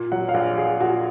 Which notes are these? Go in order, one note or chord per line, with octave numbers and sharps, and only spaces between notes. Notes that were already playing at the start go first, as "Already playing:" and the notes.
Already playing: A#2
F#3 F#5
F5
A#1 F#5
A#1 G#4
A#2 F#4